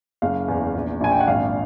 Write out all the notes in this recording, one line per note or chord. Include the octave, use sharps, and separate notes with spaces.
F#1 F5
E2
A#1
A#1 G#5
G5
F#5
G#1 F5